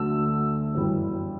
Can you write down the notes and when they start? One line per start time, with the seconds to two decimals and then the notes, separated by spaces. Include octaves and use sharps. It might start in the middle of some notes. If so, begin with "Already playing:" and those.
Already playing: D2 D3 F#3 A3 E6
0.74 G1 F#2 E3 G3